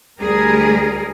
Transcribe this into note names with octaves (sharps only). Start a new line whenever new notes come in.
D2 G3 G#4 A#4